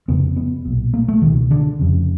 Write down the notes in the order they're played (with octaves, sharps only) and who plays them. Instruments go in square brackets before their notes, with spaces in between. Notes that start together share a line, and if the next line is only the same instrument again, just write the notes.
[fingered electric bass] F1 F2 C#3 B3
B3
B1 A#2
A#3
A3
C#2 B2 D#3
D3
F1 F2 C#3